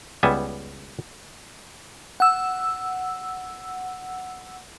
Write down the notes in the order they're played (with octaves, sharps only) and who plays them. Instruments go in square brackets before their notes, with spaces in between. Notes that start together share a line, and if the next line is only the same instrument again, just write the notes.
[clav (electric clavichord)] C#2 G3 B3 E5 G#5
[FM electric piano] F#5 E6